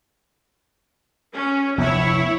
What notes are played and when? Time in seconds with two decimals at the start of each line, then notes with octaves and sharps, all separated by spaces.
1.33 C#4
1.78 F1 D2 B3 E4 C#5